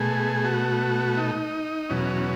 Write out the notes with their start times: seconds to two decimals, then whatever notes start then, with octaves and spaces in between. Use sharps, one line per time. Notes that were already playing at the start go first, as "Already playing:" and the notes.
Already playing: B2 A3 G#4
0.44 F#4
1.17 D#4
1.89 E2 B2 F#3 C#4